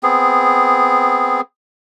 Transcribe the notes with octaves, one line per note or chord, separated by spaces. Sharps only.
B3 C4 G#4